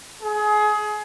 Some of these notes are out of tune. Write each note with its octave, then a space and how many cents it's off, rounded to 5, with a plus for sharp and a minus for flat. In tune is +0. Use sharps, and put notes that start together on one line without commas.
G#4 +25